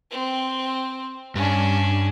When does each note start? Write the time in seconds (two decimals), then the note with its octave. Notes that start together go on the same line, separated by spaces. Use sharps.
0.11 C4
1.35 G2 C#4 D4